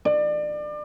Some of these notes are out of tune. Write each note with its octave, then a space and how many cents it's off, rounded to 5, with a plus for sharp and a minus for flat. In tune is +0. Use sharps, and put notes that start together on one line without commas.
D5 +30